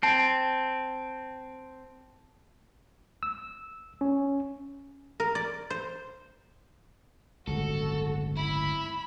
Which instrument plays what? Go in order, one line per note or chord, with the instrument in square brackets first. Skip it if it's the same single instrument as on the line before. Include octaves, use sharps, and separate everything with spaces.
[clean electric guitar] C4 [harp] A5
[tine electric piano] E6
C#4
[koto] A#4
D5
C5
[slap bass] D1 G1 C#2 [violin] F#4 [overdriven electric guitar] A4
[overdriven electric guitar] E4 [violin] B5